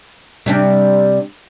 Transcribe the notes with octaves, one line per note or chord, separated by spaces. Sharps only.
C3 G3 D4